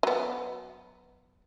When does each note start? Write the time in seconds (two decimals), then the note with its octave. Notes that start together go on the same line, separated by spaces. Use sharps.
0.03 F#3 B3